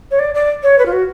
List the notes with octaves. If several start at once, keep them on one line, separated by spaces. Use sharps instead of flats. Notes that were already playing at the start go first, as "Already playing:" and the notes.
C#5
D5
D5
C#5
B4
F4
F#4